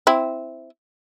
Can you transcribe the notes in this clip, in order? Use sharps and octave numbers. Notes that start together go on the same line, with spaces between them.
C4 E4